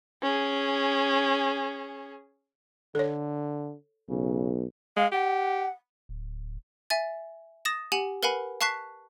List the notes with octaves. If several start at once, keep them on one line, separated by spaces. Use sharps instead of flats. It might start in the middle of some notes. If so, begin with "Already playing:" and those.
C#4 G#4
D3 A4 C#5
B1 C#3
G#3 F5
G4 F#5
D1
E5 G#5 A6
D#6 A6 A#6 E7
G4 F#5 G#5 F#7
A#4 B4 F5 F#5 G#5 B5
F5 A5 C#6 F#6 B6 C7